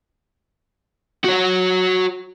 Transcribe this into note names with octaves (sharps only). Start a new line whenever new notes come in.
F#4 C#5